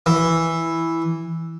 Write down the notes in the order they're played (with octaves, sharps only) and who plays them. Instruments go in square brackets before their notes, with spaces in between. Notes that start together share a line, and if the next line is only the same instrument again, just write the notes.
[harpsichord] E3